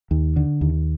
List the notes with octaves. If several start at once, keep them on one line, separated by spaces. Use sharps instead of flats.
D#2
D3
D#2